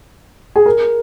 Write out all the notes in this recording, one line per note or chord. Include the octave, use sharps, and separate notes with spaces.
G#4
A#4